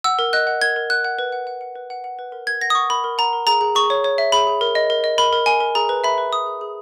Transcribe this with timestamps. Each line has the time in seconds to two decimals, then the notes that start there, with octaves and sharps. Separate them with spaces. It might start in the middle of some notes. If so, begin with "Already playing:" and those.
0.04 F#5 E6
0.19 A#4
0.33 D#5 F#6
0.47 F#5
0.62 A#4 G#6
0.76 A#4
0.90 F#5 F#6
1.04 F#5
1.19 B4
1.32 F#5
1.47 F#5
1.61 F#5
1.75 B4
1.90 F#5
2.04 F#5
2.19 B4
2.32 A#4
2.47 A#4 G#6
2.61 F#5 A#6
2.70 D#6
2.75 F#5 C#6
2.90 A#4 B5
3.04 A#4
3.18 F#5 A#5
3.33 A#4
3.47 G#4 A#5
3.61 G#4
3.75 G#4 C#6
3.90 C#5
4.04 C#5
4.18 E5
4.32 G#4 B5
4.47 G#4
4.61 A#4
4.75 D#5
4.90 A#4
5.04 D#5
5.18 A#4 B5
5.33 A#4
5.46 A#4 G#5
5.60 A#4
5.75 G#4 A#5
5.89 B4
6.04 E5 B5
6.18 B4
6.32 B4 D#6
6.46 G#4
6.61 G#4